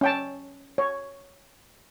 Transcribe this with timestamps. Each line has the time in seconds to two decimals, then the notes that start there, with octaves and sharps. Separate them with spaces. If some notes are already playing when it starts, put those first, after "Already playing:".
0.01 C#4 G5 A5
0.78 C#5